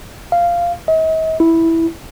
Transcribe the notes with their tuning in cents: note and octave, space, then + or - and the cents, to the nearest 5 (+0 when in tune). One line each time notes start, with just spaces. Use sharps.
F5 -10
D#5 +45
E4 -5